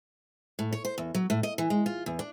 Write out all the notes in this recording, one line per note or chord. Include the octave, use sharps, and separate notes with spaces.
A2
C#5
C5
E2
F#3
A2
D#5
E3
G#3
F4
E2
D4